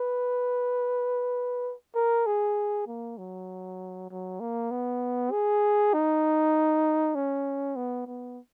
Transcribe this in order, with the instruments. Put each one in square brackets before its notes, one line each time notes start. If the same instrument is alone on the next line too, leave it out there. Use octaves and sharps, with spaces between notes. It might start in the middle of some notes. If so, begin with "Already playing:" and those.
Already playing: [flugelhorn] B4
A#4
G#4
A#3
F#3
F#3
A#3
B3
G#4
D#4
C#4
B3
B3